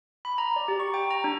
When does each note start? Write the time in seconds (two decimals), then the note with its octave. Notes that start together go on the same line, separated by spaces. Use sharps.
0.25 B5
0.38 A#5
0.56 D5
0.68 G4
0.80 C#6
0.94 G5
1.10 A#5
1.24 D4